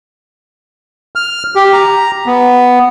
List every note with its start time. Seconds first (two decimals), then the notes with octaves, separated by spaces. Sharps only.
1.16 F6
1.55 G4
1.73 A#5
2.26 B3